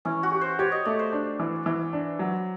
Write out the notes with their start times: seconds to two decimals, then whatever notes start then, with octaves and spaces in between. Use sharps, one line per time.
0.05 E3 C#4
0.23 F#4
0.32 G4
0.41 C5
0.59 G4 C#5
0.72 D#5
0.85 A3 D5
0.99 C5
1.13 D4
1.40 E3
1.66 E3
1.93 D4
2.19 F#3